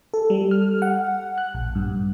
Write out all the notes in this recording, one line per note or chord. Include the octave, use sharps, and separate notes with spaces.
A4
G3
F6
F#5
F#6
A#1
G2